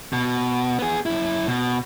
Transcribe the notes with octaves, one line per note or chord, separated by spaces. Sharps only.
B2
B3 G#4
F#2 E4
B2